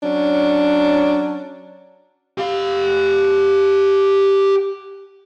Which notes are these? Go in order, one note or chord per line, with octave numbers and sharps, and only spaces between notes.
F#3 C#4 D4
G4 F5